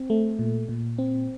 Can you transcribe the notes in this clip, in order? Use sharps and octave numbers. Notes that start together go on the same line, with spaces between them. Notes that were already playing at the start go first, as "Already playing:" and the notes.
Already playing: C4
A3
A#2
A#2
C4